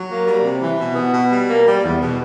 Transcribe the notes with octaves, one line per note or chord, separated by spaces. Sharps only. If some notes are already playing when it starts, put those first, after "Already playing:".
Already playing: F#3
A#3
G3
C3
E3
B2
B3
B2
G3
A#3
G3
E2
B2